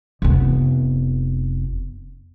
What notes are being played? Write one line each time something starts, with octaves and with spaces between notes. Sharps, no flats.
F1 B3